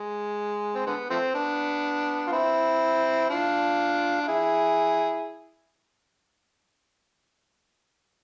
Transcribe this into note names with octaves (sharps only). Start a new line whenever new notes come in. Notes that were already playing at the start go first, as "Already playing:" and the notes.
Already playing: G#3
C4
D3 G#3 B3
F3 A3 C4
B3 D4
F4
C4 E4
D4 F4
F4
E4 G#4